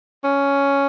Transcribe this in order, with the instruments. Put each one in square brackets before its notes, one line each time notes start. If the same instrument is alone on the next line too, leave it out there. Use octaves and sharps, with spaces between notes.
[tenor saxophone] C#4